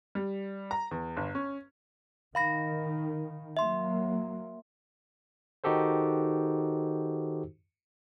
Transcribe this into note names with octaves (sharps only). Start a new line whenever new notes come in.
G3
A#5
E2
G1
C#4
D#3 F5 B5 A#6
F#3 A#3 E5 C6
D#3 D#4 F#4 G4 A4 C5